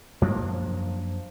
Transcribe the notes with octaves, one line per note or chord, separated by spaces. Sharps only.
F#2 F3 A#3 D4